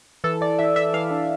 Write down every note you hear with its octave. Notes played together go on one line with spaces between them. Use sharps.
E3 A4
E3 D5
E3 E5
E3 E5
E3 F5
D4